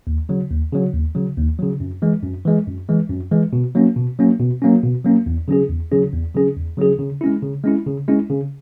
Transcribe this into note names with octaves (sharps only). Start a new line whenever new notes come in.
D#2
C#3 F#3
D#2
C#3 F#3
D#2
C#3 F#3
D#2
C#3 F#3
F#2
E3 G#3
F#2
E3 G#3
F#2
E3 G#3
F#2
E3 G#3
B2
F#3 A#3 C#4
B2
F#3 A#3 C#4
B2
F#3 A#3 C#4
B2
F#3 A#3 C#4
E2
C#3 F#3 C#4 G#4
E2
C#3 F#3 C#4 G#4
E2
C#3 F#3 C#4 G#4
E2
C#3 F#3 C#4 G#4
C#3
G#3 C#4 E4
C#3
G#3 C#4 E4
C#3
G#3 C#4 E4
C#3